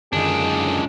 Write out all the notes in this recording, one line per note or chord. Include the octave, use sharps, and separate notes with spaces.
C#2 F#2 D3 D#3 D4 G#4